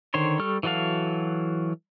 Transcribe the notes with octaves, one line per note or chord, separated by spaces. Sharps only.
D3 D#3 C5 C#5 C6
G3 A4 C#6 F6
E3 F#3 F#4 A4 F5